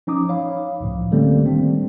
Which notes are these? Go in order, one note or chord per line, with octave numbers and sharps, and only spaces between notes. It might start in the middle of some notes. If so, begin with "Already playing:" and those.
F3 C#4 D#4 A#5 D6 D#6
C#5 F5 B5
C#2 A2 F3
D3 G3 A3 A#3 C4 C#4
D#3 G3 C4 D4